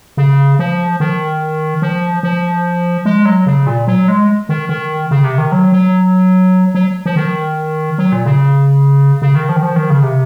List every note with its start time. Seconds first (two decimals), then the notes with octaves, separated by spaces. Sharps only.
0.17 C#3
0.59 F3
1.00 D#3
1.82 F3
2.23 F3
3.06 G#3
3.25 F#3
3.46 C#3
3.67 A#2
3.87 F#3
4.08 G#3
4.49 D#3
4.69 D#3
5.11 C#3
5.24 C3
5.38 D#3
5.52 F#3
5.72 F#3
6.75 F#3
7.06 F3
7.16 D#3
7.98 F#3
8.12 A#2
8.26 C#3
9.22 C#3
9.35 D#3
9.49 F3
9.57 D#3
9.63 F3
9.76 D#3
9.90 C#3
10.03 C3